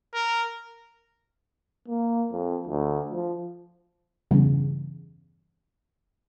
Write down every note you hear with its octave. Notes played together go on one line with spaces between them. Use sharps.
A#4
A#3
F2
D2
F3
E2 G2 C#3